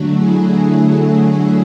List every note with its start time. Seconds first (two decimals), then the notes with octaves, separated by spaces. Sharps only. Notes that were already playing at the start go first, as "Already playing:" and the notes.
Already playing: D3 F#3 A3 F#4
0.13 E4 G#4
0.57 E4 G#4